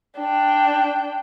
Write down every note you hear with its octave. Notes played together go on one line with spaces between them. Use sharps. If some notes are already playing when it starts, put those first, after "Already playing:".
D4 G5